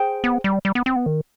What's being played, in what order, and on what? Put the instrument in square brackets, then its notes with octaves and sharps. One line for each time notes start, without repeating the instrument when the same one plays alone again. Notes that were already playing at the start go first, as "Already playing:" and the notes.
Already playing: [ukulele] G#4 C5 G5
[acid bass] B3
G3
G3
B3
C4
B3
D#3